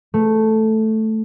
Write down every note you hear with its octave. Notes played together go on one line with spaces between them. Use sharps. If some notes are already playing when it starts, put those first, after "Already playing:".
A3